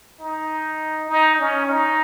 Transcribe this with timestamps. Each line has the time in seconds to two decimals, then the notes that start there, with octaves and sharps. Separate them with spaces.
0.20 D#4
1.09 D#4
1.39 C#4
1.69 D#4